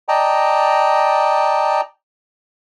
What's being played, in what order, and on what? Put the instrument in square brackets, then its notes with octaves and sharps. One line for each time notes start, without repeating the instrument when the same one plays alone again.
[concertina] D5 D#5 G5 A5 A#5